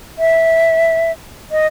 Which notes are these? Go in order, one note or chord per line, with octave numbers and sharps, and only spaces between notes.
E5
D#5